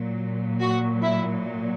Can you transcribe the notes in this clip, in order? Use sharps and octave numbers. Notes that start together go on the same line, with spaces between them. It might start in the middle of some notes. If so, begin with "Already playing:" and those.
Already playing: A#2 F#3
F#4
E4